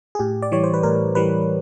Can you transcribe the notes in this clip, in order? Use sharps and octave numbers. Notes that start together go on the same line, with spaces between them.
G#4
A2 G4
D5
E3 G3 C#5
C5
B4
A2 A#4
E3 G3 B4